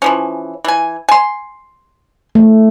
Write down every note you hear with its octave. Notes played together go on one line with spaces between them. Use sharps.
E3 F3 C#4
E3 G#5
G#5 C6
A3